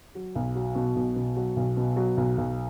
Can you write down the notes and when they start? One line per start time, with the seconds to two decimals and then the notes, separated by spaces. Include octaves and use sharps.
0.15 F#3
0.35 B1
0.55 F#3
0.75 B2
0.96 B1
1.16 B2
1.37 F#3
1.56 B1
1.77 B2
1.96 F#3
2.17 B1
2.38 B1